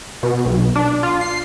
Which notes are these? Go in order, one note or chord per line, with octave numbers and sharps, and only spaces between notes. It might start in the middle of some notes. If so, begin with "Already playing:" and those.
B2
B1
D4
F4
C7